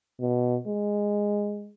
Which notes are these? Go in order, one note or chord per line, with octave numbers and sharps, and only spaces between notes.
B2
G#3